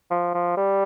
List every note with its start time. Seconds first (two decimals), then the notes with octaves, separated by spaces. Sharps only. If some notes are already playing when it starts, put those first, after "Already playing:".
0.11 F3
0.35 F3
0.57 G3